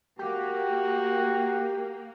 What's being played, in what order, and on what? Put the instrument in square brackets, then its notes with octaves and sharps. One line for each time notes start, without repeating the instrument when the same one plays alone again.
[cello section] A#3 [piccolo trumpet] F#4 [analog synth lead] G4